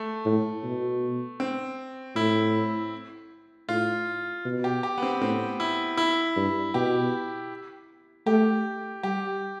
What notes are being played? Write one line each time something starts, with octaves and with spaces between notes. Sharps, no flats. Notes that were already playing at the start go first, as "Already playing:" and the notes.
Already playing: A3
A2
B2
C4
A2 E4
A2 F4
B2
G4
G4
B3
C4
A2 C4
E4
E4
G2
B2 G4
A3 G4
G3 G4